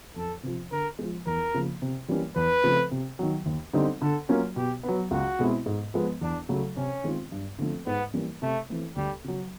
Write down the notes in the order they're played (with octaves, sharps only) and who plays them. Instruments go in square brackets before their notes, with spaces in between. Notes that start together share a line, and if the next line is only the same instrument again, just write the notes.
[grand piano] F2 [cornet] A4
[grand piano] C3 F3
[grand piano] D3 [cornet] A#4
[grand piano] F3 G#3
[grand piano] E2 [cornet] A#4
[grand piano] C#3 F3 A#3
C3
E3 G3 A#3 C#4
[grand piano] E2 [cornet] B4
[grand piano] C#3 F3 A3 C4
C3
D#3 F#3
D#2
D3 G3 C4 D#4
[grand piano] D3 [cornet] A4
[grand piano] F#3 A#3 C#4 F4
[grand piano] B2 [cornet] G4
[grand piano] F#3 B3
[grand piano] C#2 [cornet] F#4
[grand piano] B2 G#3 C4 E4
G#2
F3 G#3 B3
[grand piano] E2 [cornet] D4
[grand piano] C#3 F#3 A3
[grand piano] C3 [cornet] C#4
[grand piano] D#3 G#3 C4 F4
G2
D3 F3 A3 C4
[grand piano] G#2 [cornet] B3
[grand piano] E3 G3 A#3 C#4
[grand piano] C3 [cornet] A3
[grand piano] E3 A3 C4
[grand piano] D2 [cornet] G3
[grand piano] C#3 F#3